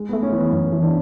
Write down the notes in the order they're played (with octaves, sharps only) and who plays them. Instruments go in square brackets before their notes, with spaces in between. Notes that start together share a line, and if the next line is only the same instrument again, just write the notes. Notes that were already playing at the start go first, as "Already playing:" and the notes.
Already playing: [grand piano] G#3
[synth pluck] A3 [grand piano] B3
[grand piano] C#4
[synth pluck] E3 [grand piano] B3
[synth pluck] F#2 [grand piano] B3
[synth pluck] E3
[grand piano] D4